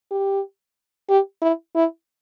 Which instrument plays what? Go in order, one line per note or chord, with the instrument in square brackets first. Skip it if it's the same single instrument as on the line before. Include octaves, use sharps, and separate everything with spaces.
[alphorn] G4
G4
E4
E4